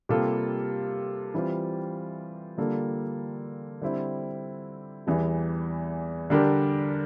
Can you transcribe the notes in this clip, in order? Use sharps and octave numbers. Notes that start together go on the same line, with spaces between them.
C3 G3 A#3 F4 A4
E3 G3 C4 F4
D3 G3 A#3 F4 A4
D3 G3 C4 E4
E2 E3 G3
D3 G3 D4 G4 A#4